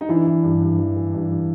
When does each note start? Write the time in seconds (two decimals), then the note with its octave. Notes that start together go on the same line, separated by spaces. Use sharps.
0.01 D#4
0.09 E3 D4 E4
0.27 E3
0.43 G2
0.60 G2
0.79 E3
0.96 E3
1.14 G2
1.30 E3